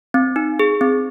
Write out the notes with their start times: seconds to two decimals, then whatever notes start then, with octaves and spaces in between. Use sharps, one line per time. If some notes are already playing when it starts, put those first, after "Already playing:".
0.14 C4
0.36 D#4
0.59 G#4
0.81 C4